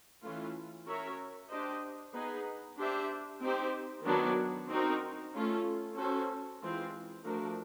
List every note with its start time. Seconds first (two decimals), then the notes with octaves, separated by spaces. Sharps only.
0.23 E3 A3 C#4 F4
0.87 C#4 F#4 A#4 C#5 E5
1.50 D4 G4 C5 D#5
2.14 B3 D#4 G#4 B4
2.79 D4 G4 C5 E5
3.42 C4 D#4 G4 C5
4.06 D#3 F#3 B3 D4
4.70 C4 D#4 F#4 A#4
5.33 A3 C#4 F4 A4
5.97 C#4 F#4 A4 C5
6.61 E3 G#3 C4 F4
7.25 F3 A3 D4 F#4 A#4